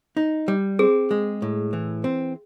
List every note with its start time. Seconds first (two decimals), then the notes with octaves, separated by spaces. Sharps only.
0.17 D#4
0.48 G3
0.79 C4 G#4
1.11 G#3
1.42 A2
1.73 E3
2.04 C4